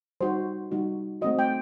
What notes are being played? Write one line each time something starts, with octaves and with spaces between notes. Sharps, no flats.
G3 D#4 F#4 C5
G3 D#4 F#4
A3 C4 F#4 D#5
G5